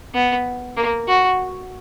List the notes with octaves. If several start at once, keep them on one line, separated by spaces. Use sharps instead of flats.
B3
A#3
F#4